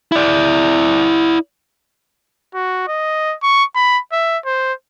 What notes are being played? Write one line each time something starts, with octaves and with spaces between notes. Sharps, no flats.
E4 D5
F#4
D#5
C#6
B5
E5
C5